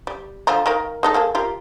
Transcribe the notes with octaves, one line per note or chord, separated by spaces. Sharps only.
G3
D3 F3 A#5
D#3 A#4 F5
G#3 D#4 A4
A#3 G#4 A4
F4 G4 A#4